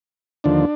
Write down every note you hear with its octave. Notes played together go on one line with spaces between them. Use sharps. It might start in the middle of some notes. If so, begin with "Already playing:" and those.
D#2 D3 F3 D4